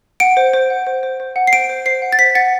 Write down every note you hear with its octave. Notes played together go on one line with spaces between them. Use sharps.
F#5 D7
C5
C5
F#5
C5
C5
C5
F#5
C7
C5 D7
C5
C5 C7
F#5
A6
C5 B6
F#5 A6